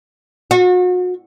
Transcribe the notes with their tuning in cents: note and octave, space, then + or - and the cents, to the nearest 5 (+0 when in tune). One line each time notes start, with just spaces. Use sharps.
F#4 -35